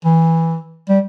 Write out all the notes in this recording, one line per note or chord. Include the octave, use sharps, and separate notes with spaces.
E3
G3